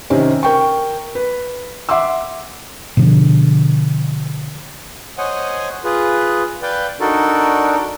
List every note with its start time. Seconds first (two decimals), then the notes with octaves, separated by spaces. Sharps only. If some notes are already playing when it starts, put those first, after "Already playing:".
0.10 C3 D#3 C4 C#4
0.43 A#4 G5 C#6
1.15 B4
1.89 E5 F#5 C6 D6 E6
2.97 B2 D3 F3
5.18 C5 C#5 D#5 F#5 G#5
5.84 F4 G#4 B4
6.63 B4 D5 F5 G5
7.00 D4 D#4 F#4 A4 A#4 D5